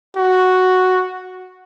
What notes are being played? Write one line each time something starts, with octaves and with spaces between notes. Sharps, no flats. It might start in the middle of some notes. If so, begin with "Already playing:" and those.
F#4